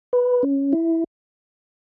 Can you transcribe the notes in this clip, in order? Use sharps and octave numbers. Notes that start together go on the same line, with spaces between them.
B4
C#4
E4